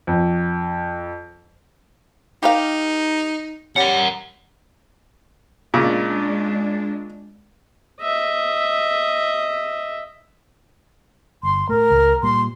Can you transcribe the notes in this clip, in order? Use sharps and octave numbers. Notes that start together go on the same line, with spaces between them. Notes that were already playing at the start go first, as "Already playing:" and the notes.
F2
D#4 G4 A#4 F5
G3 C#4 A#4 F#5
A#2 C#3 G#3 D4
D#5 E5
G1 C6
A2 A3 A#4
C#2
A#2 G3 C6